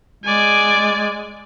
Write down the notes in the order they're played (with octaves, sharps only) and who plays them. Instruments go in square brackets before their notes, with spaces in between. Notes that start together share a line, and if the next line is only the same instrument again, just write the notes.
[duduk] G#3 [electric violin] D5 G#5